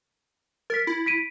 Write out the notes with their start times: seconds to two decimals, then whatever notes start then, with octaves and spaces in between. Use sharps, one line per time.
0.70 A#4 A6 B6
0.87 E4
1.06 B6 D7 D#7